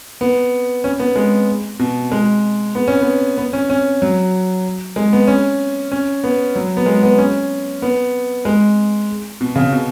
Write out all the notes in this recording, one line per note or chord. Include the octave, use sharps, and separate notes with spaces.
B3
C#4
B3
G#3
B2
G#3
B3
C#4
B3
B3
C#4
C#4
F#3
G#3
B3
C#4
C#4
B3
F#3
B3
G#3
B3
C#4
B3
G#3
B2
C#3
B2